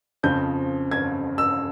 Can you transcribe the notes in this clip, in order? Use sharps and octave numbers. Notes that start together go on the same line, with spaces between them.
F2 C#3 F3 C4 G6
G#6
E6